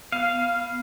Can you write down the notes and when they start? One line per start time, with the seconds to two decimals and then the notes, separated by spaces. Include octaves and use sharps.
0.12 B3 F5